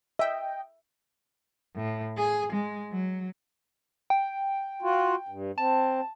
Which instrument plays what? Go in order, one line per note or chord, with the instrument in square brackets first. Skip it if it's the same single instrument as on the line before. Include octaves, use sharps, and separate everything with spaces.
[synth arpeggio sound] D#5 G5 [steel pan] E5
[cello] A2
G#4
G#3
F#3
[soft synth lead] G5
[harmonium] F4 F#4
G2
[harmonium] C4 [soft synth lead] A5